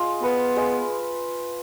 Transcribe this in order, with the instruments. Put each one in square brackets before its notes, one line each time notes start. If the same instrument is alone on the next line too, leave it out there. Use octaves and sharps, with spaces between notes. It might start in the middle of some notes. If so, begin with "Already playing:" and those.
Already playing: [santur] G#3 F4
[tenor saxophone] B3 [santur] B4
[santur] G#3